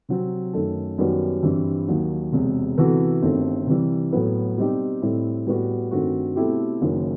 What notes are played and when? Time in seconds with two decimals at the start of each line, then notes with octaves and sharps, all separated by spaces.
0.09 C3 F#3 C4
0.53 F#2 D#3 A3
0.98 F#2 D#3 G3 B3 F#4
1.43 G2 E3 G3 C4 E4
1.88 D#2 D#3 F#3
2.32 E1 E2 C3
2.77 C3 E3 B3 F#4 A4
3.22 G1 G2 D#3 A3 C4
3.67 C3 E3 G3
4.13 A2 F#3 B3
4.57 B2 G3 C4 D#4 G4
5.02 A2 G3 C4 E4
5.47 A2 G3 B3 F#4
5.91 G2 D#3 A3 C4 F#4
6.36 B2 A3 C4 E4 G4
6.81 F#1 F#2 D#3